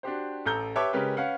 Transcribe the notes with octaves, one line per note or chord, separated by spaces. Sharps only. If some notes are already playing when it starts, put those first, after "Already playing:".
D4 F#4 G4 C5
A1 A4 A#5 G6 G7
G4 B4 C#5 E5 A5 D6
C#3 G#3 C#4 G4 A#4 B4
C#4 B4 F5 F#5